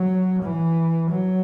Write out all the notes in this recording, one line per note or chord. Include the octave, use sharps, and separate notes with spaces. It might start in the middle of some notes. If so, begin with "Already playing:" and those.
Already playing: F#3
E3
F#3